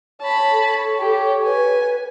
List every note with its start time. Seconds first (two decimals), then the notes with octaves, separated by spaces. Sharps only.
0.22 C#5 A5 B5
0.52 A4
0.99 G4
1.46 B4 G#5